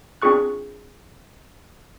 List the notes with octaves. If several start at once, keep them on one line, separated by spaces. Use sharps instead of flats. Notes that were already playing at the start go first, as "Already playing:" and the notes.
C4 D4 F4 G#4 C#6 F#6